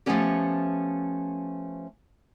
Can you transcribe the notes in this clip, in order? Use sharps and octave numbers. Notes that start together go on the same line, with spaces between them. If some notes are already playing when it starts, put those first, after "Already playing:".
F3 G3 A3 B3 C#4 G4